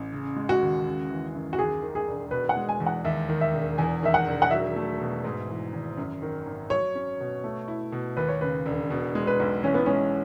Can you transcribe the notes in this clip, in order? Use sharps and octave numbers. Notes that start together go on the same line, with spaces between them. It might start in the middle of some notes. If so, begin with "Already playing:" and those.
Already playing: A1
C#3
G#3
F#4
D#2
C#3
E3
F#2
F#4
D#2 G#4
D#3
G#4
E1
B2 B4
F#5
G#3
G#5
E2
F#5
D#2 E5
D#3
E5
E1
E2 G#5
D#3 E5
F#5
E1
F#5
F#3 E5
A3
B2
G#2
E3
G#1
F#2
D#3
G#1
F#3 C#5
C#4
B2
A3
E4
B2
D#2 B4
C#5
C#3 B4
E1
B2
G#3
B4
B1
E3 C#4
B3
G#3 C#4